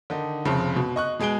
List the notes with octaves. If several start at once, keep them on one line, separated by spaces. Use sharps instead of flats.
D3 D#3 D#4
F1 F2 C#3
B2
D#5 C#6 F#6
B2 G#3 G#4 D7 G7